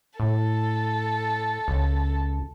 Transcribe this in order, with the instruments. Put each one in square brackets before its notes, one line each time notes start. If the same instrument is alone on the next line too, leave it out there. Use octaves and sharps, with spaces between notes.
[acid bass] A2 [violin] A4
[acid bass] C#2